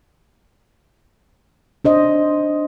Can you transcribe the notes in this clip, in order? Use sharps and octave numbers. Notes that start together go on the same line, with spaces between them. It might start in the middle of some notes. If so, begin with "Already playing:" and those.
D4 C5 D#5